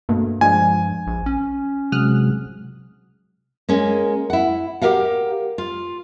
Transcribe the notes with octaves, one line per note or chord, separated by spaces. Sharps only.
G2 B2 A3 A#3
F3 G#3 D4 G#5
A#1
C#4
C3 F#3 G#3 D#6 F6 F#6
G#3 A#3 C#4
E4 F#5
G4 G#4 A#4 F5 F#5
F4